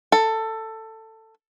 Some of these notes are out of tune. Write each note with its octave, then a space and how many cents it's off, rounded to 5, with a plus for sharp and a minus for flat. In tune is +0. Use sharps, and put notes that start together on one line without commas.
A4 +15